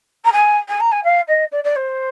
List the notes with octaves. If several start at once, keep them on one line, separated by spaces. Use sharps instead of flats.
A#5
G#5
G#5
A#5
G#5
F5
D#5
D5
D5
C5